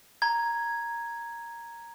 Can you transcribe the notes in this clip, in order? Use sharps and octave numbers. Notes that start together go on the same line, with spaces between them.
A#5 G#6